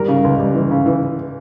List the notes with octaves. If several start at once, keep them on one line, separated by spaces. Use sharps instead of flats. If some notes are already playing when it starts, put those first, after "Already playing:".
Already playing: D#3 G3 A#4
C#3
C#2
G3
E3
C#3
E3